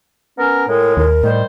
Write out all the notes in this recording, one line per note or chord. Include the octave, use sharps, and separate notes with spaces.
B3 C#4 A#4
A2 G#3 A#4
D#2 A#4
A2 D#3 G3 C5